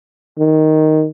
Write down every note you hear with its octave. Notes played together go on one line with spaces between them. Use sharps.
D#3